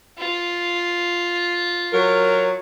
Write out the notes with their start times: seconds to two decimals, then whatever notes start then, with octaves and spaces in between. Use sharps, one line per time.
0.18 F4
1.93 F#3 A#4